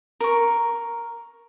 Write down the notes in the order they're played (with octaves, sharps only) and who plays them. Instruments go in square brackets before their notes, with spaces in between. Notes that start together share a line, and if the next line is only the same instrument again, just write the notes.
[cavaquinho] A#4 C#6